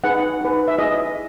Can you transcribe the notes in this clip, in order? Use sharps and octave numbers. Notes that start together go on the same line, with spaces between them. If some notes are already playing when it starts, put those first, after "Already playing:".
D#4 G#4 B4 F#5
D#4 G#4 B4
E5
E4 G#4 B4 D#5